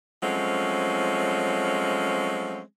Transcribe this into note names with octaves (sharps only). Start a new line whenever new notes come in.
F3 F#3 G#3 A3 C4 C#4